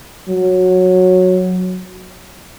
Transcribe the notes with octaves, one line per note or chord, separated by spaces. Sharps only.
F#3